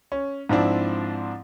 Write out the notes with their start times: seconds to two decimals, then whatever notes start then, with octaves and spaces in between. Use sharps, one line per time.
0.12 C#4
0.49 G#2 F3 C4 D4 E4